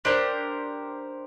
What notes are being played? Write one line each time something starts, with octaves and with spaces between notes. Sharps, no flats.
D4 G4 A#4 C5